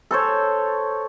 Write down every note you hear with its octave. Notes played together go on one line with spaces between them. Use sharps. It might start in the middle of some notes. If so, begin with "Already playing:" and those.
A4 C5 C#5